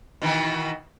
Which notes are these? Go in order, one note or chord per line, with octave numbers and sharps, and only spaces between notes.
B2 D#3 E3